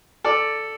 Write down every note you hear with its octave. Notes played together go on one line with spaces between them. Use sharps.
A4 D5